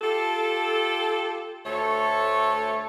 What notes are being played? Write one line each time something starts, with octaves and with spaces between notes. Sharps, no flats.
F4 G4 A4
D2 A3 A4 C#5